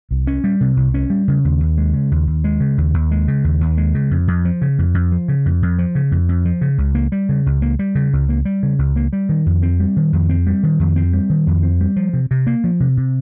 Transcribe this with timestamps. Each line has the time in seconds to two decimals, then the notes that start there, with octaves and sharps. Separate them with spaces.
0.11 C2
0.27 C#4
0.44 G3
0.61 C3
0.77 C2
0.94 C#4
1.10 G3
1.28 C#3
1.45 D#2
1.60 D#2
1.78 G#3
1.94 C#3
2.11 D#2
2.27 D#2
2.44 G#3
2.60 C#3
2.78 D#2
2.94 D#2
3.11 G#3
3.28 C#3
3.44 D#2
3.61 D#2
3.77 G#3
3.95 C#3
4.11 F2
4.28 F2
4.45 F3
4.62 C#3
4.79 F2
4.94 F2
5.12 F3
5.28 C#3
5.46 F2
5.62 F2
5.79 F3
5.95 C#3
6.11 F2
6.29 F2
6.46 F3
6.61 C#3
6.78 C#2
6.95 A#3
7.12 G3
7.29 C#3
7.46 C#2
7.62 A#3
7.79 G3
7.95 C#3
8.13 C#2
8.29 A#3
8.45 G3
8.63 C#3
8.79 C#2
8.96 A#3
9.13 G3
9.29 D#3
9.46 F2
9.63 C4
9.80 G3
9.96 D#3
10.13 F2
10.30 C4
10.47 G3
10.63 D#3
10.80 F2
10.96 C4
11.13 G3
11.30 D#3
11.47 F2
11.63 C4
11.81 G3
11.96 F3
12.13 C3
12.31 C3
12.47 A#3
12.64 F3
12.80 C3
12.97 C3